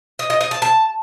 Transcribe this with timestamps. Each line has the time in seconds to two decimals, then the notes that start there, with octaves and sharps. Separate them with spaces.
0.19 D#5
0.30 D#5
0.41 D#5
0.51 A5
0.62 A5